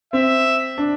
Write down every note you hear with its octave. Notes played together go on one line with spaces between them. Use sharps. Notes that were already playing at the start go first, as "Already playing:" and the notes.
C4 E5
D4